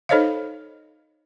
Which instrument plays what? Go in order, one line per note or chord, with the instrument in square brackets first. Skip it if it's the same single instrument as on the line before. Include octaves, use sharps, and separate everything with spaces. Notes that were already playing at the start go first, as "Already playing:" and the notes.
[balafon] D#4 A4 C5 C#5 D#5 F5